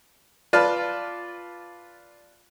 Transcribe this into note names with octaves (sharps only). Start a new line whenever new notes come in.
F4 B4 D5 A5